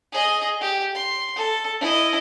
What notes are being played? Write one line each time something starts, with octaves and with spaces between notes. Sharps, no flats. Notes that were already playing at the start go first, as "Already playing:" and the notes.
G#4 D#5
G4
C6
A4
E4 D#5